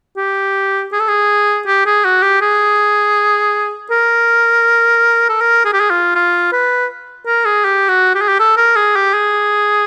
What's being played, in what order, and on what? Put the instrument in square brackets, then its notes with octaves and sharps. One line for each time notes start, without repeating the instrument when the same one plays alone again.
[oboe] G4
G#4
A4
G#4
G4
G#4
F#4
G4
G#4
A#4
A4
A#4
G#4
G4
G#4
F4
F4
B4
A#4
G#4
G4
F#4
G4
G#4
G4
A4
A#4
G#4
G4
G#4